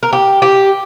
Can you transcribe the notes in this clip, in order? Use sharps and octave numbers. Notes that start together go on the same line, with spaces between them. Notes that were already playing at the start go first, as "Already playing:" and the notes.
A#4
G4
G4